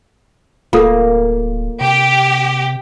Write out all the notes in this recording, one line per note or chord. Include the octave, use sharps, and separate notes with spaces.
D1 A#3 F4 A4
C3 G4